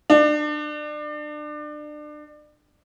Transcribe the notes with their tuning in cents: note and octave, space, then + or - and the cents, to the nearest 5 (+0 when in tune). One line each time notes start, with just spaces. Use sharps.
D4 +30